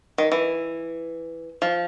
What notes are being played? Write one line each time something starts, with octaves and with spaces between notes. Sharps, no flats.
D#3
E3
F3